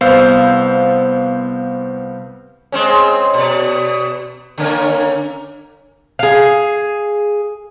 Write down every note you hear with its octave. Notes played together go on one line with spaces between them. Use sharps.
C2 B3 C5 F5 E6 G6
G#3 C4 C#4
B2 D5
D3 A#3 C#4
G#4 F5